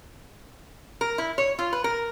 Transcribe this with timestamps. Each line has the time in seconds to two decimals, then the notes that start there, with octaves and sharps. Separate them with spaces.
1.01 A#4
1.18 E4
1.38 C#5
1.59 F4
1.73 B4
1.84 A#4